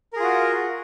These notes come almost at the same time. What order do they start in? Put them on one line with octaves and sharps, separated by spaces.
A#4 G#4 F4 F#4